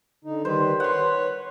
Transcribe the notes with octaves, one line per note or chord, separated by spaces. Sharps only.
D3 D#4
D#3 G3 B4 C5
B4 C#5 F#5 C6